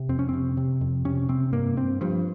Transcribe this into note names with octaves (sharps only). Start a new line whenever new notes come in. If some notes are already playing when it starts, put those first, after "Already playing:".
Already playing: C3
F2 C4
C#4
C3 C4
C3
F2
C3 C#4
C3 C4
G2 A#3
G2 C4
G2 F3